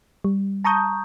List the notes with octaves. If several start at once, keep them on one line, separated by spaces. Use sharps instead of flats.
G3
A5 A#5 C#6 D#6 G6